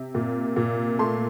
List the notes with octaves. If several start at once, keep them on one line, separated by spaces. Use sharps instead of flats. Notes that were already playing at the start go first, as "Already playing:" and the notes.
Already playing: C3
A#2
A#2
A3 C6